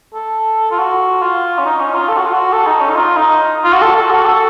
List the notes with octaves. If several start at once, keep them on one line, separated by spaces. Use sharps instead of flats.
A4
F4
F#4
F4
C#4
D#4
C#4
F4
A4
F#4
F4
F#4
A4
D#4
C#4
D#4
F4
D#4
F4
F#4
A4
A4
F#4
A4